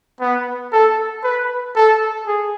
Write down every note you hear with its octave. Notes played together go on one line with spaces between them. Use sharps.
B3
A4
B4
A4
G#4